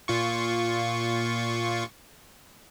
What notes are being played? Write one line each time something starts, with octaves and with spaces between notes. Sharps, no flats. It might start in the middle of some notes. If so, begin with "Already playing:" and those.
A#2 F4 C#6